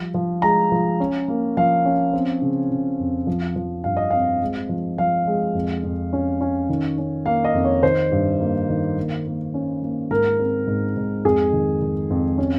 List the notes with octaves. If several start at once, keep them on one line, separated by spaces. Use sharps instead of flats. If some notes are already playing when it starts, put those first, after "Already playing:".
Already playing: F3 G3
F3
G#3 A#5
F3
C#4
A#3
F3 F5
C#4
C4
C#3
C#3
F2
F3
F3
G2 F5
D#5
C4 F5
G#3
F3
F3 F5
G#3
F2
F2
C#4
C#4
D#3
C#4
A#3 F5
D#5
F2
C#5
D#3 C5
G2
A#3
D#3
A#3
A#3
C#4
A#3
G#2 A#4
C4
G#2
G#2
F2 G#4
D#3
D#3
F2
C#4